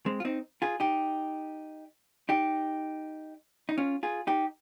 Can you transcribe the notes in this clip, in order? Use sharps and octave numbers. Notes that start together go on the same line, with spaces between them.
G#3 C4
F4
C4 D#4
F4 G#4
D#4 G4
D#4 G4
D#4
C#4 F4
F4 G#4
D#4 G4